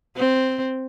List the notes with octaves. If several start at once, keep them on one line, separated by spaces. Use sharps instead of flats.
C4